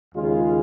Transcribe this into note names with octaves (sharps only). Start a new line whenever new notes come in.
D#2 C#3 G#3 F4 G#4